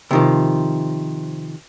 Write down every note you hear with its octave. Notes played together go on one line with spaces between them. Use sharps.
C3 D#3 F3